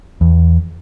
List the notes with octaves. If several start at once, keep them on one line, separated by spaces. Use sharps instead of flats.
E2